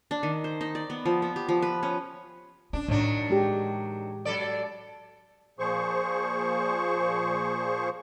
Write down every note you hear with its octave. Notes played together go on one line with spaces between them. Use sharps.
D4
D#3
C5
D#4
D5
B3
F3
B3
G4
F3
B4
C#4
C#4 D4
A2 D#3 E3 F#3 D4
G#3 G4
F#3 A4 D5
A#2 F3 G#4 C5 C#6